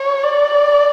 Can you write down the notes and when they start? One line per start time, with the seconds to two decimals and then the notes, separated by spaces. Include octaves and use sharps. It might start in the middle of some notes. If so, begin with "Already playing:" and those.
Already playing: C#5
0.24 D5